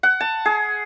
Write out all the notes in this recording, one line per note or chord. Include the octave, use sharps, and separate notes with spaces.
F#5
A5
G#4